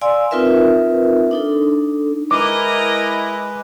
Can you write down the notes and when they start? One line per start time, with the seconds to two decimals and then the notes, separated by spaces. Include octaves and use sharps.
0.01 D5 F5 G#5 C6 E6
0.31 C4 D#4 F4 A#4 B4 E5
1.31 D4 D#4 A4
2.31 G#3 E4 A#4 B4 D#5 D6